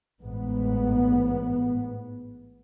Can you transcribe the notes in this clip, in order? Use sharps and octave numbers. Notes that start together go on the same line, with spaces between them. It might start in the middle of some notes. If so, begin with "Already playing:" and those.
A1 G#2 B3